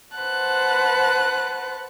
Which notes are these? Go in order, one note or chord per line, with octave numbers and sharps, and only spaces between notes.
B4 C5 F#5 A5 F#6